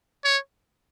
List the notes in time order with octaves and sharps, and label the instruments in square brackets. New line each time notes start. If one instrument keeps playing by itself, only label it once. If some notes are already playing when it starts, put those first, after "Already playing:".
[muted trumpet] C#5